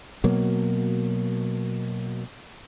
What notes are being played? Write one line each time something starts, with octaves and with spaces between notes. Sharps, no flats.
B2 F#3 A#3